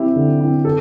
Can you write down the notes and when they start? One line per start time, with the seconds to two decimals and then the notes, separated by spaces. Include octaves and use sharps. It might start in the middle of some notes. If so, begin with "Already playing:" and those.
Already playing: C4 E4 G4
0.16 D3
0.40 C4 E4
0.65 A4